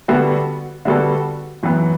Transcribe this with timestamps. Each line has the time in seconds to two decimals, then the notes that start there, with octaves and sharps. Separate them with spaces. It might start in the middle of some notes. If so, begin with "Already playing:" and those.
0.08 D3 G3 B3 F#4 A4
0.85 D3 G3 B3 F#4 A4
1.63 F#2 E3 B3